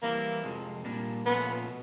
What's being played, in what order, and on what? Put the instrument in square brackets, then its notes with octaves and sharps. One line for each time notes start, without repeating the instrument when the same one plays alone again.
[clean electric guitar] E3 G3 C4 E4 [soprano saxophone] A#3
[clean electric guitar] F2 C3 F3 G#3
A#2 G3 A#3 D4
[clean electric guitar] A#2 F3 A3 C#4 F4 [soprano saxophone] B3
[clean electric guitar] B2